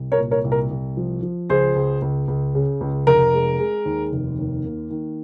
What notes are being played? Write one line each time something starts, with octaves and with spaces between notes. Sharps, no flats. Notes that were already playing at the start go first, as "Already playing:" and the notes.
Already playing: C2
A#4 C#5
A#2
A#4 C#5
C2
A#4
C2
F3
F3
C#2 G#4 C5
C#2
C#2
C#2
C#3
C#2
F1 A#4
G#3
G#3
D#2
F1
D#2
A#3
D#3